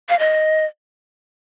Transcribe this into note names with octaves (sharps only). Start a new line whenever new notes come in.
F5
D#5